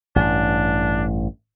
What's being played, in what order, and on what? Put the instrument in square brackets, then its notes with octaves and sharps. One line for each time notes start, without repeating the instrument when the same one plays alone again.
[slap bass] A1 G2 [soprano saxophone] D4